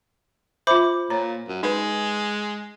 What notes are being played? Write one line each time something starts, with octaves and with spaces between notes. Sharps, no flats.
F4 C5 E5 B5 D6
A#2 C#5 A#5
F#2
G#3 D#4 B4